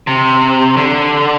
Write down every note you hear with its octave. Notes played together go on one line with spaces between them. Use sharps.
C3
D3